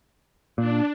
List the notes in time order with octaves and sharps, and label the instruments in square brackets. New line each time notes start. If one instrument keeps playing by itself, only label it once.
[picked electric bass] A#2 [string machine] D4